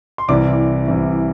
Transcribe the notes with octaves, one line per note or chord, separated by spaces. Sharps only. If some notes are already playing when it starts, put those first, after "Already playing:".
C6
C2 C3 E3 D5 D6
C2 C3 E3